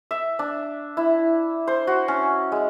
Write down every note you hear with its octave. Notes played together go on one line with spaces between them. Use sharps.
E5
D4
E4
C5
F#4
C#4
G#3